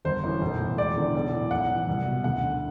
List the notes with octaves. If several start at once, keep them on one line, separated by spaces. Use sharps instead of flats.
G1 C5
F#2 E3
B1
A2 E3
E1 D5
E2 D3
B1
A2 E3
B1 F#5
A2 E3
C2
B2
D2 F#5
D3